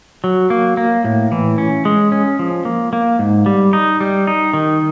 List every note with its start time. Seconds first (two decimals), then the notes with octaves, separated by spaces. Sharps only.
0.24 F#3
0.50 A#3
0.77 A#3
1.04 A2
1.32 E3
1.58 C#4
1.85 G#3
2.12 C#4
2.39 F3
2.65 A#3
2.93 A#3
3.19 G#2
3.46 G3
3.73 D#4
4.00 G3
4.27 D#4
4.54 D#3